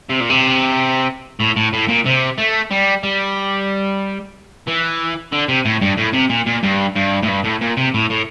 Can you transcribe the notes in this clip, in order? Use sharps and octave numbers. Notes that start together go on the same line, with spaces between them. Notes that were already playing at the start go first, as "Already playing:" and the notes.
C3
A#2
C3
A2
A2
A2
A#2
C3
A3
G3
G3
E3
D3
C3
A2
G2
A2
C3
A#2
A#2
G2
G2
A2
G2
A2
A#2
C3
A2
A2